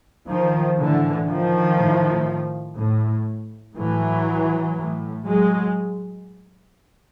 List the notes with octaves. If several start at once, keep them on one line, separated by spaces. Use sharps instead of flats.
D#3 F3
A2 D3 E3
D#3 F3
A2
A2
A2 E3 F#3
A2
F#3 G#3